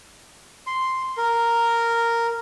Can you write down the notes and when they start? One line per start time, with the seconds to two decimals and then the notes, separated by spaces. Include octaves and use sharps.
0.67 C6
1.17 A#4